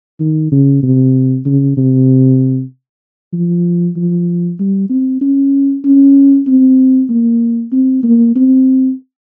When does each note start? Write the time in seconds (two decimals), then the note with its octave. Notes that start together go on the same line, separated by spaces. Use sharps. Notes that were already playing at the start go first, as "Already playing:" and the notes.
0.20 D#3
0.51 C#3
0.83 C3
1.46 C#3
1.77 C3
3.33 F3
3.96 F3
4.60 G3
4.90 C4
5.21 C#4
5.84 C#4
6.47 C4
7.10 A#3
7.72 C4
8.03 A#3
8.36 C4